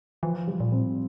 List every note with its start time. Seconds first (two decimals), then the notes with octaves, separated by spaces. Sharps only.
0.23 E3 F3
0.47 G3
0.60 A#2
0.72 C4
0.78 A2